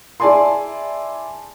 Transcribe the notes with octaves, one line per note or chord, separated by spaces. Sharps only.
E4 G#4 D5 G#5 A5 C6